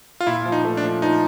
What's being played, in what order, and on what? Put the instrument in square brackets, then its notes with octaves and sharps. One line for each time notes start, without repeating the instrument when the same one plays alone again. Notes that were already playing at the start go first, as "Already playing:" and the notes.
[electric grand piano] F4
[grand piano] A#2 [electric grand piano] E4
[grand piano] F3
[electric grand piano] D#4
[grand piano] A3
[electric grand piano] D4
[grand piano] F3
[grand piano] F3 [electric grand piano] D#4